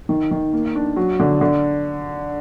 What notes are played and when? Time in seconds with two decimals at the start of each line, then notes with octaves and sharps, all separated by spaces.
0.09 D#3
0.31 D#3
0.53 A#3
0.75 D4
0.96 F#3
1.19 D3
1.41 D3